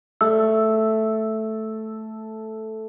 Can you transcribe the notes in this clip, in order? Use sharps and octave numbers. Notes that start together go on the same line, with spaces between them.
A3 E6